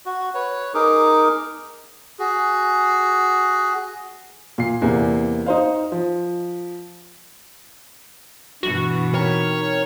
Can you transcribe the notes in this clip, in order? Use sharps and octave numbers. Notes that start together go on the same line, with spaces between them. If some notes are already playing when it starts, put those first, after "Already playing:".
F#4
B4 C#5
D#4 G#4 A#4 D6
F#4 G#4
A#2 C7
E2 C3 A#3
D#4 C5 F5
F3
G2 B2 E3 F#4
C4 D#4 A#4 C#5